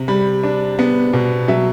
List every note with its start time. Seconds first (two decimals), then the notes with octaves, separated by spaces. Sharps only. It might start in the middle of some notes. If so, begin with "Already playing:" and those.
Already playing: C3
0.08 G3 B5
0.43 D4
0.79 B3
1.13 B2
1.48 F#3 E5